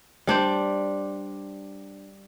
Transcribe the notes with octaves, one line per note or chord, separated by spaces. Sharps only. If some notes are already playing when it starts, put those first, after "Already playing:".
G3 D4 C5